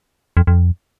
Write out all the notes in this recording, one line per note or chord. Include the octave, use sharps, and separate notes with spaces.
F2
F2